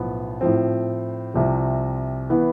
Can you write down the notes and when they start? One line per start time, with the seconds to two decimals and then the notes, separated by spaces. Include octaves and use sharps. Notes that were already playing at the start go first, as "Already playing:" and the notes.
Already playing: B1 A2 F3 B3
0.41 A2 F3 C4
1.34 C2 C3 F3
2.30 E3 B3